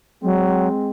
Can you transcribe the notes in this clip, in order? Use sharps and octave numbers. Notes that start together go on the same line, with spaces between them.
F#3 G#3 C4